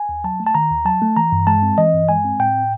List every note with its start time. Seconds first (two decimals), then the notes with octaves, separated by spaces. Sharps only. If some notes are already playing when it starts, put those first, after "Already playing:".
Already playing: G#5
0.09 D#2
0.24 F#3 A5
0.40 A3
0.46 A5
0.55 D#3 A#5
0.71 D#2
0.85 F#3 A5
1.02 A3
1.17 E3 A#5
1.32 G2
1.47 G#3 A5
1.62 C4
1.78 E3 D#5
1.94 G2
2.09 G#3 G#5
2.25 C4
2.39 A2 G5